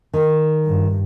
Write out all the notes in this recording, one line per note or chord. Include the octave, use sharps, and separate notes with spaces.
D#3
G2